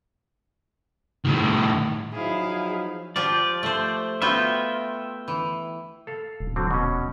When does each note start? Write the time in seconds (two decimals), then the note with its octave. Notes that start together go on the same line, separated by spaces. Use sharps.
1.25 A2 D#3
2.13 F3 F#3 D#4 E4 G#4 F5
3.16 F3 F4 G4 D5
3.63 A3 C5
4.22 B3 F4 F#4 E5 G5
5.28 E3
6.07 A4 F5
6.40 D#1
6.56 D3 F#3 C4
6.71 B2 C#4